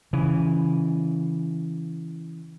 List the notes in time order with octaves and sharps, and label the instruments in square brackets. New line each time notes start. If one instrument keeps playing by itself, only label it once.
[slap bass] C#3 E3